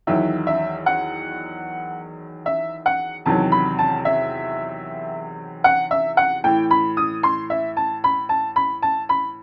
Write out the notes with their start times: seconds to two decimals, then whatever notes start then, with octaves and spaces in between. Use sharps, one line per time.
0.07 E2 D#3 F#3 E5
0.47 E5
0.86 F#5
2.46 E5
2.86 F#5
3.26 E2 C3 D#3 F#3 A5
3.52 B5
3.79 A5
4.05 E5
5.64 F#5
5.91 E5
6.17 F#5
6.44 A2 E3 G5
6.71 B5
6.97 D#6
7.23 C6
7.50 E5
7.77 A5
8.04 B5
8.29 A5
8.56 B5
8.82 A5
9.09 B5